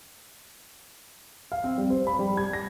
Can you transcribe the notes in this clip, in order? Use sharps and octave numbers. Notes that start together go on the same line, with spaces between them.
F5
C4
G3
C5
B5
G3
G#6
A#6